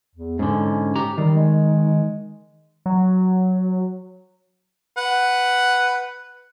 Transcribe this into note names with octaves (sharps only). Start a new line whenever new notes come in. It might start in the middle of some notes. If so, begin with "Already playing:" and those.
E2
G#2 D3 C#4
G4 A#5
D#3 G3
G#3
F#3
B4 F#5